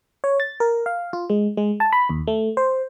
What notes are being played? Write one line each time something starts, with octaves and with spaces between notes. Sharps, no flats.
C#5
A6
A#4
F5
F4
G#3
G#3
A5
B5
D#2
A3
C5